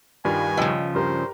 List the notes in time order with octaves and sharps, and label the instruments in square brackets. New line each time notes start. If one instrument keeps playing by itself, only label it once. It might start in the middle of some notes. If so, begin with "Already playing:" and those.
[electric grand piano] G2 D#3 G3 [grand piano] F4 F5 [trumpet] G#5
[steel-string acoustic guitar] C#3 F3 [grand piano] D#5 G5 E6
[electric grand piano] G2 [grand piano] G4 A#4 [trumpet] C5